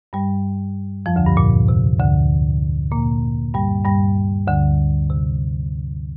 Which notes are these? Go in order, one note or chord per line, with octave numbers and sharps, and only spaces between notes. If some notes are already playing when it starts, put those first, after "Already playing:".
G2 G3
F2 F3
D2 D3
G2
A#2
C3
D2 D3
A#2 A#3
G2 G3
G2 G3
D2 D3
C3